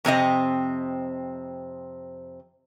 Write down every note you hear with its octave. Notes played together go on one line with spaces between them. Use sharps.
F2 C3 C4 D#5